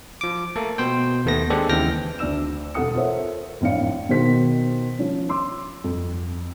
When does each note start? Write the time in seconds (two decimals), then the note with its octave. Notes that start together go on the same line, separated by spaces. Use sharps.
0.21 F3 D6
0.56 A3 A#3 A4
0.78 B2 C5 G5
1.26 D#2 A3 B3 A#6
1.50 G#3 B3 C4 D4 G4 A4
1.69 D#2 C#3 E3 G5 F6 A#6
2.19 D2 D4 D5 E6 E7
2.74 E1 C2 A4 F#5 D#6 C#7
2.94 F4 A4 A#4 C5 C#5 E5
3.61 G#1 F2 A2 D4 F5 C#7
4.09 B2 D#3 C5 B6
4.99 F3 C#4
5.29 C6 D6 E6
5.84 F2